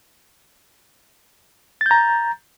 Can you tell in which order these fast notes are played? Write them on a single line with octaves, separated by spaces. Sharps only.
A6 G6 A#5